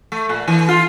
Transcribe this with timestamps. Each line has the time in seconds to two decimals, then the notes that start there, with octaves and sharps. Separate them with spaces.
0.12 A3
0.29 A#2
0.48 E3
0.69 F4